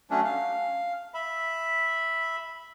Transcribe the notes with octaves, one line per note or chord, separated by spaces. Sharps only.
F#3 A3 C#4 D4
F5
E5 B5